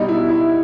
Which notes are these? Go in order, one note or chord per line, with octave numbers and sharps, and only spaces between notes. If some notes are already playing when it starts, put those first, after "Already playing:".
Already playing: B2 G3 D#4
E4
E4